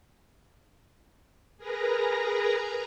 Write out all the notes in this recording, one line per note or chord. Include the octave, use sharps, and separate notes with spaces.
G#4 A#4 B4 A#5